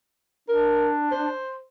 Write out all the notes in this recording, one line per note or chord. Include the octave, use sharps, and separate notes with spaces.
D4 A#4
C5